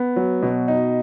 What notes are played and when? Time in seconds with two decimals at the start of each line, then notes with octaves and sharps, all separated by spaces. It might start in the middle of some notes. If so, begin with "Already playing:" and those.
Already playing: B3
0.16 F#3
0.42 B2
0.68 D#4